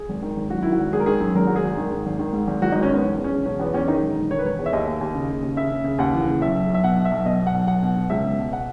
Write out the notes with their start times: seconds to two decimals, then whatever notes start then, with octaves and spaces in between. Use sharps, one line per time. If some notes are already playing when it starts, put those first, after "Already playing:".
Already playing: G#4
0.09 G#1
0.22 D#3
0.36 G#1
0.50 F#2 F#4
0.62 D#3 E4
0.72 F#4
0.79 G#1
0.93 G#1 G#4
1.00 A#4
1.06 D#3 G#4
1.20 F#2
1.35 G#1 A#4
1.47 G#2 F#4
1.56 G#4
1.63 G#1
1.77 D#3
1.92 G#2
2.06 G#1
2.19 D#3
2.33 G#2
2.47 G#1
2.62 G#1 F#4
2.72 G#1 D#4
2.83 C#4
2.90 D#3 B3
3.04 E1 C#4
3.18 E2
3.24 C#4
3.32 E1
3.46 E1 C#4
3.59 E2 B3
3.74 E2 C#4
3.88 D#3 D#4
4.02 E1
4.17 E1
4.31 D#3 C#5
4.39 B4
4.44 E1 C#5
4.59 E2
4.66 E5
4.73 D#2 D#5
4.87 D#2
5.01 D#2
5.14 C#3
5.29 C#3
5.42 D#2
5.57 C#3 E5
5.71 C#3
5.84 C#3
5.98 D#2 F#5
6.13 E3
6.27 C#3
6.41 B1 E5
6.55 B1
6.69 B1
6.74 E5
6.83 B2 F#5
6.97 B2
7.05 E5
7.11 B1
7.25 B2 D#5
7.39 B1
7.47 F#5
7.54 B1
7.67 B1 F#5
7.82 B2
7.96 B2
8.10 C#2 E5
8.24 B2
8.39 B2
8.53 F#5